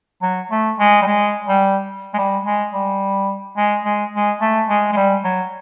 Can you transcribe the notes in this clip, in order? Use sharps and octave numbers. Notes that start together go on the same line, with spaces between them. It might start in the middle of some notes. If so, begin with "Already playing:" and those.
F#3
A3
G#3
G3
G#3
G3
G#3
G3
G#3
G3
G#3
G#3
G#3
A3
G#3
G#3
G3
F#3